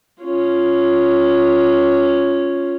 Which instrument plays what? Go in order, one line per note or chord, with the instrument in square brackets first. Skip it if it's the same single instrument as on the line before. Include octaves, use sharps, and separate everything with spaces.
[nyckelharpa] C#4 F4